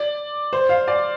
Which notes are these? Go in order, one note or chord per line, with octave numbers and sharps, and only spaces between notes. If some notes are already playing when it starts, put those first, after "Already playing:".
Already playing: D5
C5
F5
D5